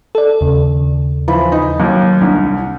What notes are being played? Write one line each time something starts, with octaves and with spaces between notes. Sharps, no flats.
A4 D5
D#2 C#3
E3 F3 B5
D#4
D#2 F#3
C2 D4